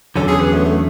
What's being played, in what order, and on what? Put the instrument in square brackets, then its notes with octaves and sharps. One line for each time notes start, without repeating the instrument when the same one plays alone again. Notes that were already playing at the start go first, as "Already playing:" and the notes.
[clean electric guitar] E2 D3 F#3 C#4 [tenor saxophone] A4
[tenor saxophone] G#4
B3
A3
A3